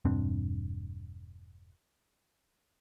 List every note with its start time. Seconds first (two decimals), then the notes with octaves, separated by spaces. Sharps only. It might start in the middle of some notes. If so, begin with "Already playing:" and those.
0.05 E1 G2 C4 D4